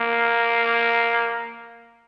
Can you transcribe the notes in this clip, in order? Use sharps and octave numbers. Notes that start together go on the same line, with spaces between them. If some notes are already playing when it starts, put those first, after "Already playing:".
Already playing: A#3